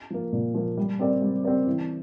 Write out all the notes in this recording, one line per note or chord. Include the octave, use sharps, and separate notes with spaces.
F3 A#3
A#2
F3 A#3
G3
C4 G4 A#4 D5
G3
C4 G4 A#4 D5
E3